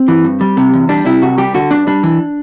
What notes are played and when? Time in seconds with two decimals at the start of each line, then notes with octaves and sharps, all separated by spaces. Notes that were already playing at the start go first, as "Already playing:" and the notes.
Already playing: C4
0.08 E3
0.24 G2
0.41 G3
0.57 C3
0.74 E2
0.89 G3 D4
1.05 C3 E4
1.22 C2 F#4
1.38 G3 G4
1.54 D3 F#4
1.71 G2 D4
1.87 G3 D4
2.03 E3